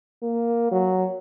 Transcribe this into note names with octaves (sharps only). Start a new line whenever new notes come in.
A#3
F#3